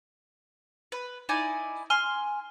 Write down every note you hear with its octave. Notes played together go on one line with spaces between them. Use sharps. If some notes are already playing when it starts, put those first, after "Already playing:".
B4
D#4 E4 D5 G#5
G#5 C6 F6